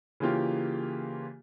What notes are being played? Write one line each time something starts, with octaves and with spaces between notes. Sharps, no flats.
C#3 E3 A#3 F4 G4